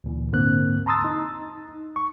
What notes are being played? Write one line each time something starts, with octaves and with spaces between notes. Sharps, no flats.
D2 A#2 E3
G#2 D3 A#3 C4 F#6
A5 A#5 C6 D#6 E6 A6
D#4
C#6